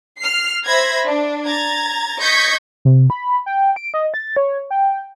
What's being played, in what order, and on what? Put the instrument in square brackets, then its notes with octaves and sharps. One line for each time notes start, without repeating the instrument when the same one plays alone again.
[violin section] F6 C7
C5 E5 B5 G#6 A#6
D4
A#5 G#6 A6
D#5 C#6 G6 G#6 A#6 B6
[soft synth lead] C3
B5
G5
D7
D#5
A6
C#5
G5